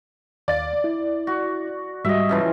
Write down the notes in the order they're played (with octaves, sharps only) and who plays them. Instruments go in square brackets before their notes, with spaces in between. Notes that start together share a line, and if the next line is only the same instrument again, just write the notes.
[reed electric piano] D#2 F5 A6 [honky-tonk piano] D5
[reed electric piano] E4
[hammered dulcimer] F#4
[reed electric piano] G#2 G3 F#4 [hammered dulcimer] D#5 E5
[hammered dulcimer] C#3 E3 F3